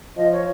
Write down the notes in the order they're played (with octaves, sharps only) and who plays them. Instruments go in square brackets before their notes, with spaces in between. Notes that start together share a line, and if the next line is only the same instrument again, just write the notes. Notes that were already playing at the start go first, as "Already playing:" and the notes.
[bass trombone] F3 [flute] D#5
[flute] C#5